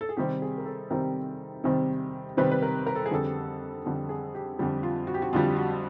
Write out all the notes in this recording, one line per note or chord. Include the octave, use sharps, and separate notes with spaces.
A4
G#4
C3 D#3 G3 C4 G4
G#4
A#4
A4
C3 D#3 G3 C4 A#4
C3 D#3 G3 C4
C3 D#3 G3 C4 B4
B4
A#4
A#4
A4
G#4
F2 D3 G3 A4
F2 D3 G3
G#4
G4
F2 D3 G3
F4
F#4
G4
F#4
F2 D3 G3 F4
F#4